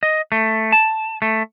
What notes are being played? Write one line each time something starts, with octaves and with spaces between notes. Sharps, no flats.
D#5
A3
A5
A3